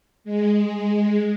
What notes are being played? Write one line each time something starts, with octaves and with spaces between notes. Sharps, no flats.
G#3